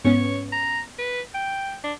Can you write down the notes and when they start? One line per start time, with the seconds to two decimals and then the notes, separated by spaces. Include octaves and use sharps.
0.05 G#2 B3 C#4 C#5
0.53 A#5
0.98 B4
1.34 G5
1.84 D4